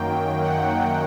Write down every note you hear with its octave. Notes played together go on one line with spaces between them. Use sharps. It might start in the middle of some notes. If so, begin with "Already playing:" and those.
Already playing: F#2 D#3 F#3 A#3 G5
F#5